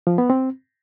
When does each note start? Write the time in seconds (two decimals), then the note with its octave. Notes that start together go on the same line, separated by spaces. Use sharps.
0.07 F3
0.18 B3
0.30 C4